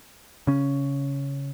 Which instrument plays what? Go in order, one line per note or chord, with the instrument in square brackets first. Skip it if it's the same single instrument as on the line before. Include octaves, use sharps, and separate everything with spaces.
[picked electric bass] C#3 C#4